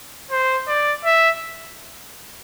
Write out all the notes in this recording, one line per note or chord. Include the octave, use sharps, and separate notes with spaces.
C5
D5
E5